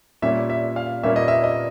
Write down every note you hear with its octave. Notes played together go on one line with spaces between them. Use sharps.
A#2 G3 A#3 C#4 E5
E5
F5
A#2 G3 A#3 C#4 E5
D#5
E5
D#5